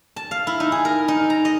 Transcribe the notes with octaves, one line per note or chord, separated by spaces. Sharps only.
A5
F5
E4
D#4
G#4
A#4
D#4
A#5
D#5